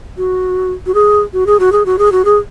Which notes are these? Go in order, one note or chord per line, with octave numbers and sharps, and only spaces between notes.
F#4
F#4
G#4
F#4
G#4
F#4
G#4
F#4
G#4
F#4
G#4